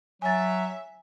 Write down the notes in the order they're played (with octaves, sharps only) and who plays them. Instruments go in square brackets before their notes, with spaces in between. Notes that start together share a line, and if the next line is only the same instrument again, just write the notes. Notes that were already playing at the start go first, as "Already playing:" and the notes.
[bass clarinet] F#3 [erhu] E5 [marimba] G#5 A6